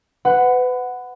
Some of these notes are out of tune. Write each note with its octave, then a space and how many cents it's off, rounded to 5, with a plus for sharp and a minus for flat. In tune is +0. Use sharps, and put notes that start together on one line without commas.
B4 +30 F#5 +0 B5 +25